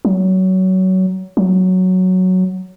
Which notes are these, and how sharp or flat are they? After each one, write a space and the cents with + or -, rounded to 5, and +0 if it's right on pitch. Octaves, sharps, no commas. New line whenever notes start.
F#3 +20
F#3 +0